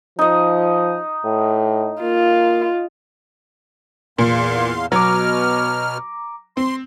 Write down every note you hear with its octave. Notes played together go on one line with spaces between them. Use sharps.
F3 D#4 D#5
A2
A#3 F4
E2 A#2 F5 C6
B2 F#3 A#5 D6 F6
C4 C6